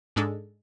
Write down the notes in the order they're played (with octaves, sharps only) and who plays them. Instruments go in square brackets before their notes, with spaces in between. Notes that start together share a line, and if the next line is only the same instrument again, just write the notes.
[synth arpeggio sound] G#2 G#3 D4 A4